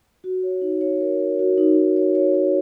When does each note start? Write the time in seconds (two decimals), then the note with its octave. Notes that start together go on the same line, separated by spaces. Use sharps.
0.24 F#4
0.43 C#5
0.62 D#4
0.81 C#5
1.01 A#4
1.19 A#4
1.39 F#4
1.58 D#4
1.77 D#4
1.96 C#5
2.15 C#5
2.34 C#5